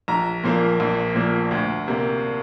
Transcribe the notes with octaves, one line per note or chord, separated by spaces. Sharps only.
A#1 A#5
A#2 F3 A#3
A#1
A#2 F3 A#3
D2
C3 A#3